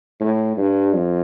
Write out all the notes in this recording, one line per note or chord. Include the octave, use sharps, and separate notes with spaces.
A2
G2
F2